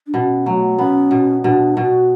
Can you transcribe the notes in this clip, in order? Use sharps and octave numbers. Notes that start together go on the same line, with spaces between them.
D4
B2 C#4
F#3 A3
B3 C#4
B2
B2 D4
B2 F#4